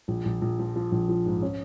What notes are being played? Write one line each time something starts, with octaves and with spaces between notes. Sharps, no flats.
A#1
A#1
A#1
F3
F3
A#1
F3
G#2
C#4